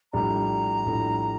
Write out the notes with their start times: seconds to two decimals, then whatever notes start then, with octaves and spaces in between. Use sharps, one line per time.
0.13 A#1 A2 G3 D4 A#5
0.86 A#1 A2 G3 D4